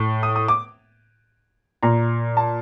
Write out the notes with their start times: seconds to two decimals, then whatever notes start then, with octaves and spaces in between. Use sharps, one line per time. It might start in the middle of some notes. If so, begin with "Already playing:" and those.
Already playing: A2
0.23 D#6
0.36 D#6
0.48 D6
1.83 A#2 A#5
2.37 A5